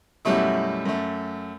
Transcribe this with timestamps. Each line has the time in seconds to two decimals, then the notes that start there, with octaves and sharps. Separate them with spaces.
0.25 F#2 B2 F#3 G3 A3 E4
0.85 F#2 A3